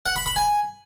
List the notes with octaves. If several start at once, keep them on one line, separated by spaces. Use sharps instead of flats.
F#5
B5
B5
G#5